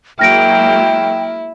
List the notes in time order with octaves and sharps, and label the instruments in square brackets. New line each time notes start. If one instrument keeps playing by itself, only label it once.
[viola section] F#3 G#3 A#3 [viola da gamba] E4 [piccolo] G5 [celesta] F6 A#6 D7